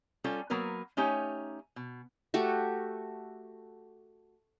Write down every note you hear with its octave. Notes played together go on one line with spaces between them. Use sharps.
G3 C#4 F4 A4
F#3 A#3 B3 A#4 B4
A3 C#4 D#4 G4 C#5
B2
A3 F#4 G4